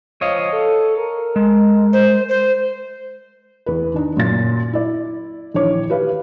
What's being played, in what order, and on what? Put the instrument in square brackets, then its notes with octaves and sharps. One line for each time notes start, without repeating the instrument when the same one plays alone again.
[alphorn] F3 [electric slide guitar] C#5 D#5 F5
[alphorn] A4
A#4
[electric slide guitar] G#3
[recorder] C5
C5
[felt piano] E2 B4
D#3 D4 D#4
F#2 A#2 A6
E4 D5
A#1 D#3 E3 C#5 D6
G4 B4 F5